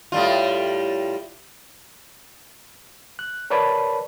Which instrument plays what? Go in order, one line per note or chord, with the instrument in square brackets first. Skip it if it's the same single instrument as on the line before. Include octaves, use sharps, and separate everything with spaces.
[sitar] A2 G3 F4
[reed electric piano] F#6
A#4 B4 C#5 D5 A5 B5